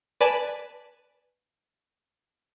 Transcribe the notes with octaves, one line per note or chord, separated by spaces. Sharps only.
B4 D5 G#5 A5